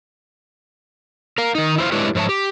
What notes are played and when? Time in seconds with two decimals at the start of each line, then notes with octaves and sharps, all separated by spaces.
1.38 A#4 F5
1.55 D#3 D#4
1.78 E4 C5 F5
1.92 G#3 D4 E4 G4 B4 C#5
2.15 G#2 F3 C#5 E5 A5
2.29 G4